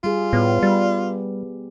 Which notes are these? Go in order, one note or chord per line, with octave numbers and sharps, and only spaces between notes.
G3 F4 G#4
A2 B3
G3 G4